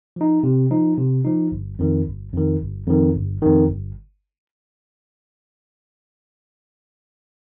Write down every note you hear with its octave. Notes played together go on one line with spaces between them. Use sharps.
F3 D#4
C3
F3 D#4
C3
F3 D#4
G1
F2 D#3
G1
F2 D#3
G1
F2 D#3
G1
F2 D#3
G1